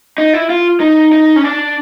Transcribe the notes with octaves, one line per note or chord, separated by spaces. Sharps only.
D#4
E4
F4
D#4
D#4
C#4
D4